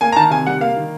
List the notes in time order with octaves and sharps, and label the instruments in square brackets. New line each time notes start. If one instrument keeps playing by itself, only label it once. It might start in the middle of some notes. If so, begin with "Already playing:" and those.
[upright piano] A#3 G#5
A#5
D#3 A5
C3 G#5
G3 F#5
A#3 F5
D#3